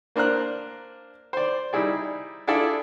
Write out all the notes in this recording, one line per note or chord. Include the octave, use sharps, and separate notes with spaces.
A#3 D4 C5 A#5 F#6
C5 D5
G3 D#4 E4 G#4 D5
D4 E4 F4 G#4 A4 D5